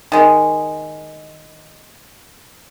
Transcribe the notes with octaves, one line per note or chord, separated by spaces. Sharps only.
D#3 G#3